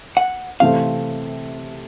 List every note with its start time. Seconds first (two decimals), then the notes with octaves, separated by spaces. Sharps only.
0.17 F#5
0.60 C3 E3 A3 C4 F5